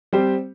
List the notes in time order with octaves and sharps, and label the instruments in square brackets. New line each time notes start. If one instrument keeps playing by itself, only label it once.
[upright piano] G3 C4 G4 C5